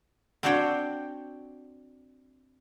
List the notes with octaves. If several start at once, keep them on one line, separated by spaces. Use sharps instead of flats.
C4 D4 F#4 C5 C#5 G5